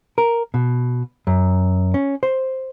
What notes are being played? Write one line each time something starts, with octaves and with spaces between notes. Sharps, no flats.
A#4
B2
F#2
C#4
C5